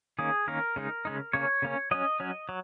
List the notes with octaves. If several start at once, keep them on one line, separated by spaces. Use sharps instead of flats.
D#3 A#3 C#4 G#4
D#3 A#3 C#4 A#4
C#3 G#3 D#4
C#3 G#3 D#4
C#3 A#3 C#4 C#5
C#3 A#3 C#4
F#3 C#4 D#5
F#3 C#4
F#3